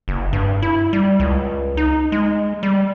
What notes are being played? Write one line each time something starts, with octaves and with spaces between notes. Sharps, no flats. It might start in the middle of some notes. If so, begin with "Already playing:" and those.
F#1
G2
E4
G3
C#2
D#4
G#3
G3